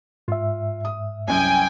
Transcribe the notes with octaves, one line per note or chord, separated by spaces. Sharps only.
G#2 F4 E5
D#6
C2 F#2 G5 G#5